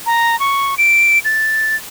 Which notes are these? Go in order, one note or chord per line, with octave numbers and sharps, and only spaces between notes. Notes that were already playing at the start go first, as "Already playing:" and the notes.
A#5
C#6
D7
A6